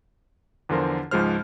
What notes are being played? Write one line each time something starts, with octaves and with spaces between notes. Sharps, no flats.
E2 D3 F3 F4 A#4 C5
C#2 G#2 F3 G#3 C5 F6